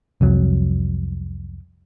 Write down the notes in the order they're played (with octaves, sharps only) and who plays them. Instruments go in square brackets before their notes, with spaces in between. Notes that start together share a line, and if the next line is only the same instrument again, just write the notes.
[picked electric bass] C2 F2 F#3